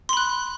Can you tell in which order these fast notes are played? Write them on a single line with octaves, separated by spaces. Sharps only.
C6 B5 F#6